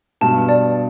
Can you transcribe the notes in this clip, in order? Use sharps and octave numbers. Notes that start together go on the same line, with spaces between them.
G2 B2 A5
D5